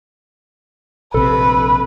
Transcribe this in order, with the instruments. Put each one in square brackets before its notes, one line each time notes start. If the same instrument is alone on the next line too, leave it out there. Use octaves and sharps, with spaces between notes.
[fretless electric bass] A#1 C3 [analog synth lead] A4 [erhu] B4